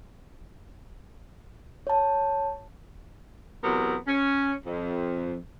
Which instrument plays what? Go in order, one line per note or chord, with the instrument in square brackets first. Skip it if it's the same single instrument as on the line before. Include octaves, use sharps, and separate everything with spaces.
[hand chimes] C#5 A5
[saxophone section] E2 C3 F#3 B3 A#4
C#4
F2